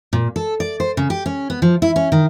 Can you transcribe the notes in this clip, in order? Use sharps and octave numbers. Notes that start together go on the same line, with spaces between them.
A#2
A4
D5
C5
C#3
G4
C#4
B3
F3
E4
C#4
D#3